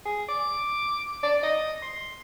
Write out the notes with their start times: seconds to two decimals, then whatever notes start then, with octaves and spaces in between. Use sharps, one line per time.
0.05 G#4
0.29 D6
1.23 D5
1.43 D#5
1.82 C6